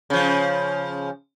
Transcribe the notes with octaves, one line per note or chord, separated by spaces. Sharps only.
C#3 F3